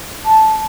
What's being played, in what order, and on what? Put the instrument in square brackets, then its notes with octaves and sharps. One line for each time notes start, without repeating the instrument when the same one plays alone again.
[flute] A5